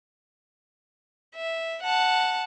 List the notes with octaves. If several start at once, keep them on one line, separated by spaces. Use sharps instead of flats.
E5
F#5 A5